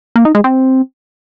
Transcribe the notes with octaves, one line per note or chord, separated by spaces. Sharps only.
A#3
D#4
G#3
C4